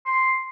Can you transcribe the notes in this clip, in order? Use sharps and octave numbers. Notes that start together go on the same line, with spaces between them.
C6